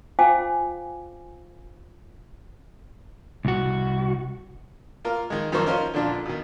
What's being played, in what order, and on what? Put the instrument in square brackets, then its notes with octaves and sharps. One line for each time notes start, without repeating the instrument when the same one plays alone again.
[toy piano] F4 C5 F5 G5 G#5 D6
[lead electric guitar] C2 F#4
[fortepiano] A#3 F4 A#4
D#3 G#3
F#2 D#3 F3 A#3 C5 C#6
C#4 D#4 F4 A#4 C5
A#2 D3 F3 D4 F4
B2 D#3